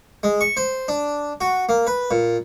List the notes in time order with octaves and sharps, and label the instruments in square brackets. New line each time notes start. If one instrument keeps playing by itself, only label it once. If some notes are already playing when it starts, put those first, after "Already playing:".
[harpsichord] G#3
C#6
C5
D4
F#4
A#3
B4
A#2